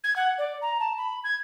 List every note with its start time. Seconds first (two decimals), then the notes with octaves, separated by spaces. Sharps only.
0.04 G#6
0.16 F#5
0.38 D5
0.61 A#5
0.80 A5
0.97 B5
1.24 G#6